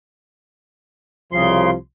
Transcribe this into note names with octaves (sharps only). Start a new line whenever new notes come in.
C2 C#3 F3 C6